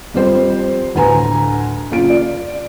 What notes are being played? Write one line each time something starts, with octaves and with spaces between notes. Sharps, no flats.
F2 G3 C5
D2 A2 B4 G#5 A#5
F#1 F4 D7
D5